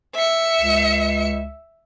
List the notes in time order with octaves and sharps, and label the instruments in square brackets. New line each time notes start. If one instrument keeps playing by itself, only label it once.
[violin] E5 C#7
[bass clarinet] C#2